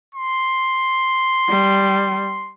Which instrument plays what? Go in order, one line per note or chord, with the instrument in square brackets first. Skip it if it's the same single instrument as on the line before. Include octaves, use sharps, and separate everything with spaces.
[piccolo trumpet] C6
[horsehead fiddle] G3